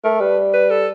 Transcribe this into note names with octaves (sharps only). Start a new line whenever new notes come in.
A3 A#4
G3 B4
B4
A4